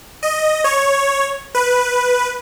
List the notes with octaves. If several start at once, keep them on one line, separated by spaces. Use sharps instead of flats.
D#5
C#5
B4